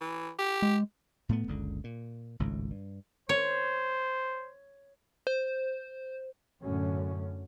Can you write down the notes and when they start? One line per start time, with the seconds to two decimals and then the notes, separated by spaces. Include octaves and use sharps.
0.01 E3
0.39 G4
0.62 G#3
1.29 A2 A3 B3
1.48 F#1 C#2 D3
1.84 A#2
2.39 G#1 C#2 A2
2.71 G2
3.29 C5 C#5
5.27 C5
6.63 F#2 A2 D3 C#4